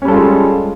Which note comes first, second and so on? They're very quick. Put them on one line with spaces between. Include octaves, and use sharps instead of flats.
C#4 G3 A4 F4 G#3